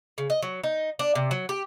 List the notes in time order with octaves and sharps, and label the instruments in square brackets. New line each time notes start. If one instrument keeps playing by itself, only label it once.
[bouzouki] C#3
D#5
F#3
D#4
D4
C3
F#3
G4